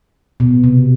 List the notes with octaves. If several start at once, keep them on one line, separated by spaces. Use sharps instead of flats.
B2
C3